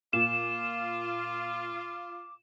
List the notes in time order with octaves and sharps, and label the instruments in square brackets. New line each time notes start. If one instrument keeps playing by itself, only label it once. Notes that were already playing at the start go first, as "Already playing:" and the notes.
[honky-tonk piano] A#2 [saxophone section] F4 [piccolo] D6 [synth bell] E7